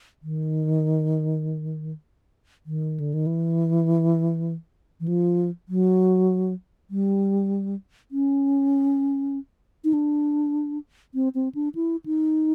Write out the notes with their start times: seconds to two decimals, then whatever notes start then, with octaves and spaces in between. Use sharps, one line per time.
0.23 D#3
2.66 D#3
3.00 D3
3.14 D#3
3.26 E3
5.00 E3
5.08 F3
5.69 F#3
6.90 G3
8.11 C#4
9.84 D#4
9.93 D4
11.14 C4
11.35 C4
11.55 D4
11.75 E4
12.06 D#4